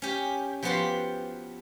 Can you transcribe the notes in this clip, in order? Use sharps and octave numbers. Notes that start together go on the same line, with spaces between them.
C#4 G4
F3 B3 F#4 G4 F#5 C6